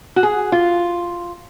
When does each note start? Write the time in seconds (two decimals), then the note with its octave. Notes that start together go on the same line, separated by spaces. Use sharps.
0.16 F#4
0.23 G#4
0.52 F4